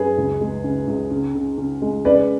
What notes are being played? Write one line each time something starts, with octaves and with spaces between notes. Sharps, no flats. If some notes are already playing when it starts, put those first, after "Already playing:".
Already playing: F#2 G#4 B4
C#2
G#3
C#3
C#2
C#3
C#3
C#3
G#3
C#3 B4 D5